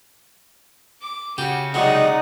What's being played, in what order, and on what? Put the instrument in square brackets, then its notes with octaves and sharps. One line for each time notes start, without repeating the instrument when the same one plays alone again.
[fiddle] D6
[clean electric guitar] C#3 [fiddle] C#4 F#4 [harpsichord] G4
[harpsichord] C3 F#3 G#3 [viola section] D#4 [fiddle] D5 F#5